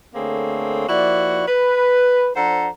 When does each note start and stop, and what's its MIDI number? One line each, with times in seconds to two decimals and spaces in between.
0.15 0.86 50
0.15 0.86 57
0.15 0.86 58
0.15 0.86 60
0.15 0.86 68
0.15 0.86 73
0.88 1.44 53
0.88 1.44 58
0.88 1.44 64
0.88 1.44 66
0.88 1.44 74
1.48 2.30 71
2.36 2.68 53
2.36 2.68 62
2.36 2.68 69
2.36 2.68 72
2.36 2.68 78
2.36 2.68 82